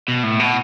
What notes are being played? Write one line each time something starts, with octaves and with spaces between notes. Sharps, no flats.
B2
A2
B2